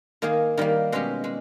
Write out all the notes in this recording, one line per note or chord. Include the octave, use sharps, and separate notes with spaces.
D#3 A#3 D#4 G#4
D#3 G3 A#3
B2 G#3 C#4 G4
G#3